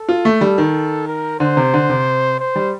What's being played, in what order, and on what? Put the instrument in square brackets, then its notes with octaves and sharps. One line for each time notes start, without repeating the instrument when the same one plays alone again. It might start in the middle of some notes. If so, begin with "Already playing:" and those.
Already playing: [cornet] A4
[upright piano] F4
A3
[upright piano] G3 [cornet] A4
[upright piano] D#3
[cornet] A#4
[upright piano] D3 [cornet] C5
[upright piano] C3
D3
C3
[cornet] C5
[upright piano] G3